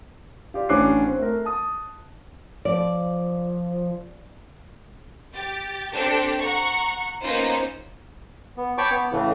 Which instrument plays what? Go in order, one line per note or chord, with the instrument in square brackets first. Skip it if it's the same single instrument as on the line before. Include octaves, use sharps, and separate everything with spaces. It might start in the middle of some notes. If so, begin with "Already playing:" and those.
[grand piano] F4 G4 D5
A1 C#4 D4 D6 F#6 C7
C4
A3 A#4
A5 D#6
[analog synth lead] F3 [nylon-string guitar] D5
[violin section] G4 A6
C4 D4 G4 A4
F#5 A#5 C#6
A#3 B3 C#4 D#4 F4 C5
[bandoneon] B3
C#5 G5 A5 B5 C#6 D6
B3
A2 C#3 E3 A3